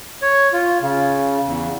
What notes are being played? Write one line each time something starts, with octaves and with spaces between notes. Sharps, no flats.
C#5
F4
C#3
E2